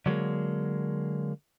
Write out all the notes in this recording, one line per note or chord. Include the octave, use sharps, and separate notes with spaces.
D3 F#3 G#3 A#3